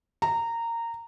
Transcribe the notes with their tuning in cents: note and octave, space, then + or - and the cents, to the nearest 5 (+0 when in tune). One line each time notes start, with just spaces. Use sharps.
A#5 -15